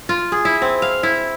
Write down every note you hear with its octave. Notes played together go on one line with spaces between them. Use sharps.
F4
G#4
E4
C4
F5
E4